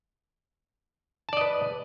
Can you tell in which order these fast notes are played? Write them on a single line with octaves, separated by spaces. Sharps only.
A5 D5 D#5 B4